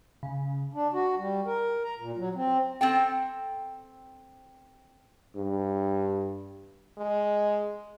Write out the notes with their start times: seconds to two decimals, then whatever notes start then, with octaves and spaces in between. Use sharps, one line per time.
0.23 C#3
0.73 D4
0.93 F#4
1.18 G3
1.45 A#4
1.84 A#5
1.99 A#2
2.17 F#3
2.35 C4
2.81 C4 A4 G5
5.36 G2
6.98 G#3